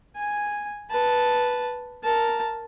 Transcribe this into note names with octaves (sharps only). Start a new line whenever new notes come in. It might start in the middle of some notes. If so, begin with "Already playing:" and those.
G#5
B4 A5
A#4 A5